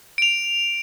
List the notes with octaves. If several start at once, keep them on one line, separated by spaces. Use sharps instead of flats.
D7 F7